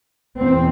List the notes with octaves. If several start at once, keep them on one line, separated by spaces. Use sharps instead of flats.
E2 B2 C4